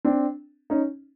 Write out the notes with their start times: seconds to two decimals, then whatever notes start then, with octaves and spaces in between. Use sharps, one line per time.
0.05 C4 D4
0.70 C#4 D#4